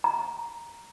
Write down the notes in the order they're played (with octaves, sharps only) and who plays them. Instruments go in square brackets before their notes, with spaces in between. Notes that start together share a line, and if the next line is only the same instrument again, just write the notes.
[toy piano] A#5